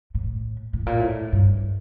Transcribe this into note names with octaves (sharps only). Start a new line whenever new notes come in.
A2
A2
A#2
A2
G2